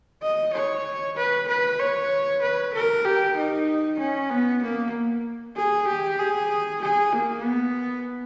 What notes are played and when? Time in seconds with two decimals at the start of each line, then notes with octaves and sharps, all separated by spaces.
0.23 D#5
0.53 C#5
1.17 B4
1.48 B4
1.80 C#5
2.42 B4
2.74 A#4
3.05 G4
3.37 D#4
3.99 C#4
4.30 B3
4.62 A#3
5.56 G#4
5.88 G4
6.19 G#4
6.82 G#4
7.13 A#3
7.44 B3